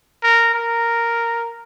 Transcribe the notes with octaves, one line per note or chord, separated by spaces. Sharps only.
A#4
A#4